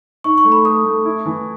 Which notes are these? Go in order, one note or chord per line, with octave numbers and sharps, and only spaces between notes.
D#4 C#6
C#6
A3
B5
A3 D#6
A3
E4
E3